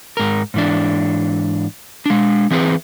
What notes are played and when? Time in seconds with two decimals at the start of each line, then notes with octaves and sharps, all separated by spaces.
0.17 G#2 A#4
0.54 G#2 E3 D4
2.06 G#3 D4
2.51 E3 C4 G#4 B4